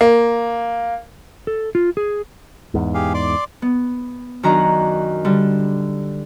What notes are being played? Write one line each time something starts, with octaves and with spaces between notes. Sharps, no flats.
A#3
A4
F4
G#4
E2 G#2
G4 G#4 F5
D5 C6 D6
B3
F#2 D#3 D4 F#4 A#5
D3 G3